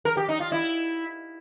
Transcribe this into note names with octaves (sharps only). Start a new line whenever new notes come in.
A#4
G4
D#4
F4
E4